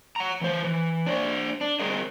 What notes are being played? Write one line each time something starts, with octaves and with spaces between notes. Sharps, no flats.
F#5 A#5
E3 C5
E3
D4 C5 D5
D4
G3 G#4 A#4 C5 D#5